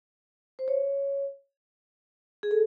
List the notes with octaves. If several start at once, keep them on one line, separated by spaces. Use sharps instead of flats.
C5
C#5
G#4
A4